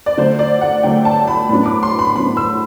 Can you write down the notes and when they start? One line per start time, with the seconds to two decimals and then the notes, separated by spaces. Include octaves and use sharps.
0.06 D5
0.17 D3 F#3 A3 C5
0.39 D5
0.61 F#5
0.83 D3 F#3 A3 G5
1.05 A5
1.27 B5
1.49 A2 F#3 B3 D4 B5
1.66 D6
1.83 C6
1.99 B5
2.16 A2 F#3 B3 D4 B5
2.37 E6